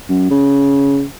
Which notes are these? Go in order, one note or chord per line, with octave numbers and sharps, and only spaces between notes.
F#2
C#3